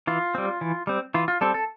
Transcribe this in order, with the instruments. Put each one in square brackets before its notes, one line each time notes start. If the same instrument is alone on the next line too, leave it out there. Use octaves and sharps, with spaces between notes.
[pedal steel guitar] E3 F4
G3 C4
E3
G3 C4
E3 F4
F4
G3 C4 A4
A4